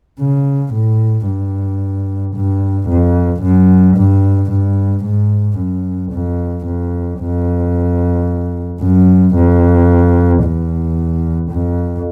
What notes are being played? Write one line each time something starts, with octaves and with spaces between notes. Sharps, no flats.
C#3
A2
G2
G2
F2
F#2
G2
G2
G#2
F#2
F2
F2
F2
F#2
F2
E2
F2